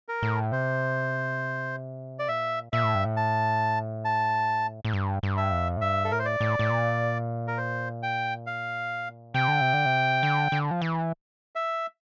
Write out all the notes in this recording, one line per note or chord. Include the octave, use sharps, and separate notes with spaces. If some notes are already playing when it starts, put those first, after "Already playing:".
A#4
A2
C3 C5
D5
A#2 E5
A#2 E5
A2
G2
A2
A5
A5
A2
G2
G2
E5
F2
A2
G2 E5
A4
A2 A#4
C5
D5
A2
A2
A#2
A#4
C5
G5
F5
C3 G5
D3
C3
D3
C3
D3
D3
F3
E3
E5